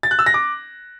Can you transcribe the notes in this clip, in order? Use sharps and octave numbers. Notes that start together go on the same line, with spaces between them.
A6
F#6
E6
A#6
D6